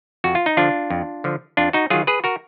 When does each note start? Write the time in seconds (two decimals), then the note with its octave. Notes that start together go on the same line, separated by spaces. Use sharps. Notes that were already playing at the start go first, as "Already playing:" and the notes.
0.24 F2 F#4
0.35 F4
0.46 D#4
0.57 D3 F3 D4 F4
0.90 F2
1.24 D3 F3
1.57 F2 D4 F4
1.73 D#4 F#4
1.90 D#3 F#3 F4 G#4
2.07 G#4 B4
2.24 F#4 A#4